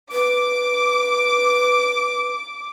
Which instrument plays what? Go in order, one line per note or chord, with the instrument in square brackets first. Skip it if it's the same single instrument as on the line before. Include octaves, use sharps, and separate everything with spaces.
[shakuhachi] B4 [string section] D6